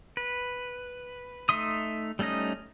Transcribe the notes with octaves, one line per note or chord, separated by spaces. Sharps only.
B4
A3 D#4 E5 C6 D#6
G3 A3 C#4 D#4 D#5